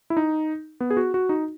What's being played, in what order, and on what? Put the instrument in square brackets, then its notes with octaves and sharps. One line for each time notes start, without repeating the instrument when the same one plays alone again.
[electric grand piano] E4
D#4
B3
G#4
F#4
F#4
D#4